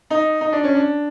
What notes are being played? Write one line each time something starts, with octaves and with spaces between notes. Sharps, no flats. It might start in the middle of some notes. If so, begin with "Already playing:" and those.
D#4
D#4
D4
C#4
D4